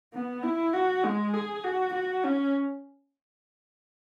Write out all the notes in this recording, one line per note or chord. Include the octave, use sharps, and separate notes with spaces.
B3
E4
F#4
G#3
G#4
F#4
F#4
C#4